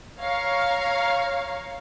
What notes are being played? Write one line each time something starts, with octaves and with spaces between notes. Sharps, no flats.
C#5 F5 A#5